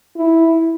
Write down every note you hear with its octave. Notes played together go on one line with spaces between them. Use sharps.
E4